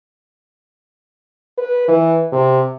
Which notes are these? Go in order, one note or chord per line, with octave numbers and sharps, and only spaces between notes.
B4
E3
C3